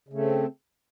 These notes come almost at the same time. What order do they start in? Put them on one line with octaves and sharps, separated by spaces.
C#3 A3 C4